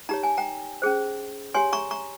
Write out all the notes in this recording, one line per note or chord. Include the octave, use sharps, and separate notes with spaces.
D#4 G4 C#5 A#5
G#5
G5 A#5
C#4 G#4 C5
G4 C#5 G#5 C6
A#5 C#6
A#5 C#6